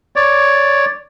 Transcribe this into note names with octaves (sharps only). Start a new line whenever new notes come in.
C#5 D5